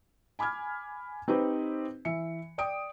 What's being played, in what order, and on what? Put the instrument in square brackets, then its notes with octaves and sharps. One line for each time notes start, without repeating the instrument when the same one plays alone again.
[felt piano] G#5 B5 D6 F6 G#6
C4 D#4 G4 B4 C5
E3 E5 C#7
D5 G5 D#6 D7